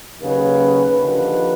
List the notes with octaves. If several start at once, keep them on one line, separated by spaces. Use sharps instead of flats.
D#2 C#3 F#3 B4
D#2 D3 F3 B4